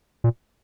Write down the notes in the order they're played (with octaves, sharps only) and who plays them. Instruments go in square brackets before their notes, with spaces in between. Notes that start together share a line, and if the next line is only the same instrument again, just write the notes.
[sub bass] A#2